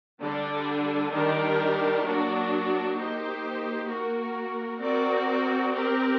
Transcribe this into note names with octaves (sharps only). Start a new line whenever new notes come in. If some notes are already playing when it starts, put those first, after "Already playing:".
D3 G3 D4
D#3 G3 D4 G4 A#4
F#3 A#3 D4 F#4
A#3 D#4 G4 C5
A#3 F#4 A#4
C4 F#4 A#4 D5
C4 G4 A#4